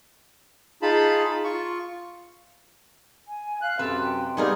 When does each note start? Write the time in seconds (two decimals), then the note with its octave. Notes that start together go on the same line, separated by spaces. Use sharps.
0.82 D#4 F4 G#4 A5 B5
1.44 F4 C#6
3.27 G#5
3.62 F5 F#6
3.79 F#2 C3 A4 B4
4.01 G5
4.37 G3 A#3 B3 D#4 G#4 A#4